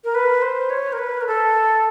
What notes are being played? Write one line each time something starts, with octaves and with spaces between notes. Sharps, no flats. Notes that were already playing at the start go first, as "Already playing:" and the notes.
A#4
B4
C5
C#5
A#4
B4
A#4
A4